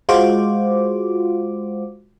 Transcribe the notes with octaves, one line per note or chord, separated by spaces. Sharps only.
G#3 F4 F#4 C5 D6